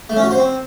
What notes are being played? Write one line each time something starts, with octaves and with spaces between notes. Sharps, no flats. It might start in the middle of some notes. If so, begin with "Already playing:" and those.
A3
C#4
F#4
C5
C4